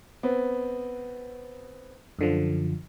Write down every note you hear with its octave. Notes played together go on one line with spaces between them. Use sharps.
B3 C4
F#2 D3 F3